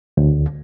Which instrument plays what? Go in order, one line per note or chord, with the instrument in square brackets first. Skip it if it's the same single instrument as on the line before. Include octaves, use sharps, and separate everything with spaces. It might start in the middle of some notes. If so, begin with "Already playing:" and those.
[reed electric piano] D2